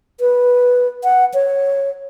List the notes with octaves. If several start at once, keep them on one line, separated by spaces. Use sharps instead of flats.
B4
F#5
C#5